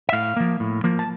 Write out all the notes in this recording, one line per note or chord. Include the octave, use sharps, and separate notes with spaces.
E5
A2 F5
F3 A#3
A2
F3 A#3
A5